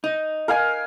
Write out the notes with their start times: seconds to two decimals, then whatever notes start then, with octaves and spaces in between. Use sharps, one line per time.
0.04 D#4
0.48 A#4 F5 G#5